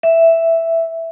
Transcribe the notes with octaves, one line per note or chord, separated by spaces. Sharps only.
E5